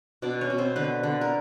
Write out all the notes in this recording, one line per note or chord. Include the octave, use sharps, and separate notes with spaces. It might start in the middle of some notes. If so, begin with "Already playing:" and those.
B2 D4 D5
C#4 C#5
B2
C4 C5
D3 B3 B4
D3
A#4